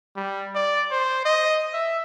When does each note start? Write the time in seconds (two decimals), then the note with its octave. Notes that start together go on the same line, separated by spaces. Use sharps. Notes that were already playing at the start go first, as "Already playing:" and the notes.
0.16 G3
0.55 D5
0.91 C5
1.25 D#5
1.74 E5